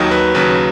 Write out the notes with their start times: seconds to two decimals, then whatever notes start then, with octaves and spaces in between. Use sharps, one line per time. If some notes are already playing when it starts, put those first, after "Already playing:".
Already playing: D#2 D#3 F#3 D#5
0.11 B4
0.35 D#2 C#3 F#3 B4